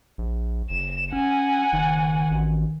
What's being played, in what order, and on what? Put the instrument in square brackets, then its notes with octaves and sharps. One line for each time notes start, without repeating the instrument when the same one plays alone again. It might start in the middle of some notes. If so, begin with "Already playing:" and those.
[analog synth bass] A#1
[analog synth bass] F#1 [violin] E7
[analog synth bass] C#4 [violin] F#5 G#5
[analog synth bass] F#1 [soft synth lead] D#3
[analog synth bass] A1